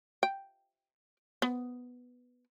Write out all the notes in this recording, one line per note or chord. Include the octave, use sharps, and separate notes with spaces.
G5
B3